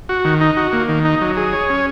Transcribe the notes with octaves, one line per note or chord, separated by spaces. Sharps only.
F#4
D#3
D#4
F#4
A#3
D#3
D#4
F#3
G#4
C#5
C#4